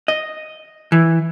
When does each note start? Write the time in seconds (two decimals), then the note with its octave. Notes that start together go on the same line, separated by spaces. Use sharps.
0.08 D#5
0.92 E3